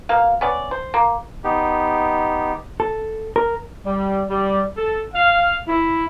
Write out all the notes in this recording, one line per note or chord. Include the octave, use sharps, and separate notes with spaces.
B2 A#3 F5
B3 C#4 D5
C5
A#3
B3 D#4 G4
A4
A#4
G3
G3
A4
F5
E4